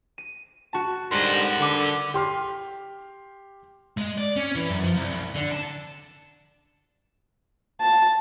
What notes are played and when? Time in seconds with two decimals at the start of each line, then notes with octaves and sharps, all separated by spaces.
0.18 D#7
0.73 F#4 A5
1.11 G#2 D3 G3 A#4 F#5 C6 F#6 A#6
1.60 D3 B4 D6
2.14 G4 C6 F6
3.97 G#3
4.17 D5
4.36 C#4
4.55 E3
4.69 F#2
4.83 F3
4.97 C2
5.36 D3
5.52 A5
7.81 A5